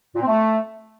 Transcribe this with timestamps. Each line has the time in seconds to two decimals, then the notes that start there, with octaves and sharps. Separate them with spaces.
0.15 A#2
0.22 C4
0.28 A3